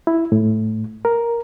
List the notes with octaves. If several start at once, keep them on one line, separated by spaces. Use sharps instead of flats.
E4
A2
A#4